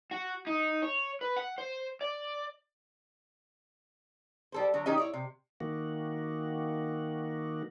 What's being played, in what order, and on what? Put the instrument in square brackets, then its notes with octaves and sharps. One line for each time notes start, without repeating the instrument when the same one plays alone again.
[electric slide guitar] F#4
D#4
C#5
B4
F#5
C5
D5
[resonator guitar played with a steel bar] G3 A4 C5
D3 F#3
D#3 C#4 D#4 G4 D#5
E4 C#5 D5
C3
[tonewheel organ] D#3 A#3 F#4